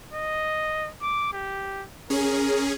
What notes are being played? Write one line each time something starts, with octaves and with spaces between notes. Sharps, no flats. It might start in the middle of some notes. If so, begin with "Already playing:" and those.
D#5
D6
G4
C#4 G#4 A#4